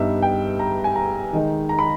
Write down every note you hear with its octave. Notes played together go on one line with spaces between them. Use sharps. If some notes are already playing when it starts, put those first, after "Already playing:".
Already playing: G2 G3 B3 D#4 E5
G5
A#5
G#5
A#5
D#3 G#3 D#4
A#5
B5